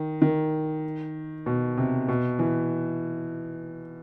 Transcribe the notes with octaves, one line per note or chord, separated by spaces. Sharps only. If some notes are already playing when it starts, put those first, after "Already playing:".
Already playing: D#3
D#3
B2
C3
B2
E3